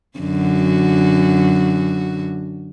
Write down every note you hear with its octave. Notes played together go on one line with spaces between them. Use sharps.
F#2 D3 F#4